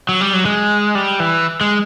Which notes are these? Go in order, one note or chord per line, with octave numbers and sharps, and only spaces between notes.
F#3
G3
F#3
G#3
G3
E3
G#3